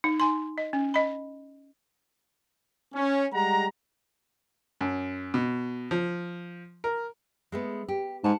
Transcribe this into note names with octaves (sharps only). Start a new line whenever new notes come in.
D#4
D#4 G#5 C6
D#5
C#4
D#5 B5
C#4
G3 G#3 F#5 A#5
F#2
B2
F3
A#4
G#3 A3 B3
G4
G#2 F#5 A5